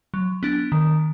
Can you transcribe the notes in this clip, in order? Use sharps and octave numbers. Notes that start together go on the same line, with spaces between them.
F#3
B3 D4
D#3